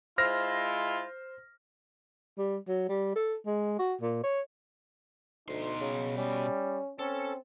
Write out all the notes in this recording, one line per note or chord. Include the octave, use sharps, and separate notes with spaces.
G#3 E4 F4 C5 F6 A#6
G3
F#3
G3
A4
G#3
F#4
A#2
C#5
D2 B2 D#4 C6
C#3
G3 C#4
C4 C#4 A4